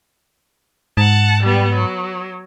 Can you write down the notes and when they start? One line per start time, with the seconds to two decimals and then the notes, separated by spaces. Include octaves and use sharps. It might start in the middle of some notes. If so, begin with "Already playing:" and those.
0.97 G#2 F#5 A5
1.43 G3 B3
1.74 F#3